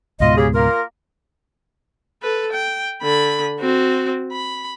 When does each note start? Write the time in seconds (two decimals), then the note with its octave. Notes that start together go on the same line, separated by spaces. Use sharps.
0.20 C#2 G#2 B2 F4 D#5
0.37 C#3 G4 G#4
0.54 A#3 F4 A#4
2.22 A4 B4
2.52 G5
3.03 D3 B5
3.60 C4 F#4
4.32 B5